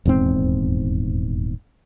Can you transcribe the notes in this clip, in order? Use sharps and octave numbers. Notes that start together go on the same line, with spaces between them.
D#1 E2 G#2 C4